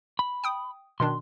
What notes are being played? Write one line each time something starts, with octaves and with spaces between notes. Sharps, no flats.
B5
G5 D#6
B2 D#3 D4 C6